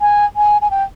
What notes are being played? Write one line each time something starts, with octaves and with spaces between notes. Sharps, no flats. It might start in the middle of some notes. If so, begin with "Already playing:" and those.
G#5
G#5
G#5
G5